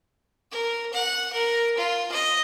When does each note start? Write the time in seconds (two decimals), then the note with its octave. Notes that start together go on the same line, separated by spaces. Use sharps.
0.52 A#4
0.93 F#5
1.33 A#4
1.78 F4
2.12 D#5